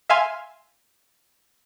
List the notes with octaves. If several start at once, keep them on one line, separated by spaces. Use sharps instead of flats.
E5 F5 G#5 C6